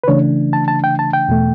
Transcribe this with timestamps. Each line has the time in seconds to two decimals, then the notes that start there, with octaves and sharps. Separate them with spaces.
0.04 B4
0.08 C#3 E3 A3 D4 C#5
0.53 A5
0.68 A5
0.84 G5
0.99 A5
1.13 G5
1.28 E2 B2 A3